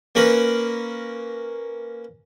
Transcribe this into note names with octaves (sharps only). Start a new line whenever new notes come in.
A#3 C#4 A#4 B4